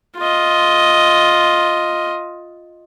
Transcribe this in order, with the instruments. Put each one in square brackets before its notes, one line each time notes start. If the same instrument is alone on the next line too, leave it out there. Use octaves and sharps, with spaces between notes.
[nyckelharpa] F4 D#5